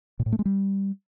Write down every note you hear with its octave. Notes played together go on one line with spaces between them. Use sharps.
A#2
A2
A3
G#3
G3